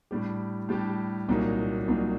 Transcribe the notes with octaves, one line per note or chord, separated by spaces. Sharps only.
A2 G3 D4 G4
A2 G3 D4 G4
C2 A#2 F#3 A#3 D#4
C2 A#2 F#3 A#3 D#4